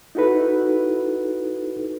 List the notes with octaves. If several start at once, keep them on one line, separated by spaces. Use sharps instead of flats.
D#4 E4 F#4 A4 B4